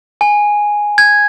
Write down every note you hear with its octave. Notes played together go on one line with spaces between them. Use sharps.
G#5
G#6